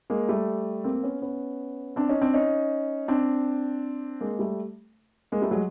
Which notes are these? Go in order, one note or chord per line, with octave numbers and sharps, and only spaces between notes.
G#3 A#3
G3 A3
A#3 C4
B3 C#4
B3 C#4
C4 D4
C#4 D#4
C4 D4
C#4 D#4
C4 D4
G#3 A#3
G3 A3
G#3 A#3
G3 A3
F#3 G#3